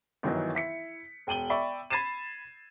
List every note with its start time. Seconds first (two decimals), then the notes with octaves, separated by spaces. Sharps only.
0.23 G1 D#3 E3 F#3 D#4
0.55 E4 B6 C#7
1.27 E1 G5 D#7 F#7 G7
1.50 D5 E5 G5 B5 C#6
1.90 B5 G#6 A6 C7 D#7 E7